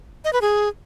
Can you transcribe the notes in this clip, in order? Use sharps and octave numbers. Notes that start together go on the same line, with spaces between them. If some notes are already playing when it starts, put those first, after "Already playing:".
D#5
B4
G#4